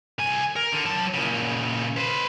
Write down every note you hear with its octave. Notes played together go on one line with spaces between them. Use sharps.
C2 G#5
A#4
D3
F#3 A5
A#2 C#3
B4 C5